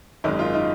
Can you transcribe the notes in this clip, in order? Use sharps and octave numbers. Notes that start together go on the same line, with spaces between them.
G#1 F#2 D#3 G#3 D#4
F4
D#4